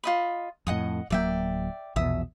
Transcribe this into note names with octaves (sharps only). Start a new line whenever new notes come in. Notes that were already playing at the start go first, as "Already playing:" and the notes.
F4 D#5 B5
F2 A2 D#5 F#5 D#6
D1 F#3 A#3 D5 E5 G5
A#1 E2 B2 E5 D#6